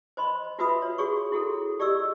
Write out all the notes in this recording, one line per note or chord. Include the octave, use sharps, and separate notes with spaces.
C5 D#5 B5 C6
F4 F#4 B4 E5 B5 D#6
C#5
F#4 G#4 C#5 C#6
E4 F#4 G#4 A4
G4 D5 D#5 C#6 E6